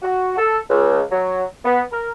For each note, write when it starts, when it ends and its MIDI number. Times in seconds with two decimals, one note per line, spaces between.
0.03 0.35 66
0.38 0.60 69
0.70 1.01 37
1.11 1.44 54
1.65 1.81 59
1.92 2.11 70